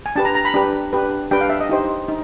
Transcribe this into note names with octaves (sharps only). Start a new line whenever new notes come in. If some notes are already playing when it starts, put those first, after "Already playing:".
G#5
D4 G4 B4 A5
A#5
A#5
B5
D4 G4 B4
D4 G4 B4
D4 G4 B4 G5
F5
E5
D#5
D#4 G4 C5
D#4